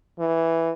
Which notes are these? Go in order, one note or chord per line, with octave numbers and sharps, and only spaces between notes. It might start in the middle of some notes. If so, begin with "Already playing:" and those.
E3